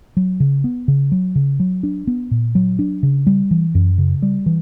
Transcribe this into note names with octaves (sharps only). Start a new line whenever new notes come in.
F#3
C#3
B3
C#3
F#3
C#3
F#3
D4
B3
A#2
F#3
D4
C#3
G3
E3
F#2
C#3
G3
E3